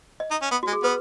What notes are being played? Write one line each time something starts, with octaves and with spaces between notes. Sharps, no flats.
D#5
D#4
C#4
B3
G#3 F#4
G#4
B3 B4